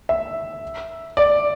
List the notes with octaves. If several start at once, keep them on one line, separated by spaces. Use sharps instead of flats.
E5
D5